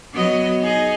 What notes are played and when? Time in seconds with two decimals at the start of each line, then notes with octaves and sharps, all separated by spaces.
0.14 F#3 B3 D#5
0.61 D#4 G#4 D#5